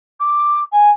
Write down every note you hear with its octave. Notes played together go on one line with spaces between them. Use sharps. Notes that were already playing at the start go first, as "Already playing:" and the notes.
D6
G#5